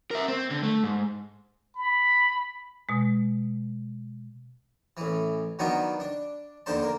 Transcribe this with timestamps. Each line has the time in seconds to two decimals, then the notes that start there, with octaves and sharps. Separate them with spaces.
0.11 A#4 E5
0.28 C4
0.51 D3
0.63 A3
0.84 G#2
1.76 B5
2.89 B2 G#3
4.97 A1 E3
5.59 D#3 F#3 B3 D4 F4 F#4
6.00 D4
6.66 D#2 D3 D4 C5 A5
6.82 A#3